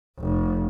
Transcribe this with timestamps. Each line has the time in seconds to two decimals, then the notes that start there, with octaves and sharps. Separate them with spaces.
0.19 F1